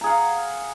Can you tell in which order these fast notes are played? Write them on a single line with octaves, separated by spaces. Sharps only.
A#5 G#4 F#5 F5